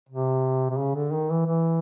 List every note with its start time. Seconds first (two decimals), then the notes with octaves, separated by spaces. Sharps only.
0.09 C3
0.70 C3
0.77 C#3
0.95 D3
1.12 D#3
1.30 E3
1.46 E3